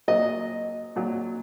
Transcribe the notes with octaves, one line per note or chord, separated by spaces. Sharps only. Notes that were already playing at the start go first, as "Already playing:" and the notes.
A#2 F#3 D#5
A#2 F#3